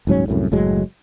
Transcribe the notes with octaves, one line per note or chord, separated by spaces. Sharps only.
D#1 G#2 F#3 C#4
C2 F#2 A2
F#1 A2 F#3 G#3